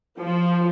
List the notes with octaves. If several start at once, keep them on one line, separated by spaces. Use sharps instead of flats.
F3